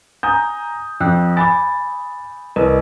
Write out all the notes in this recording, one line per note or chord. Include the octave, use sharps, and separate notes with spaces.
G#5 A#5 D#6 G6
F2 G5 E6 F#6
G#5 B5 D6 A6
C2 A#4 B4 D#5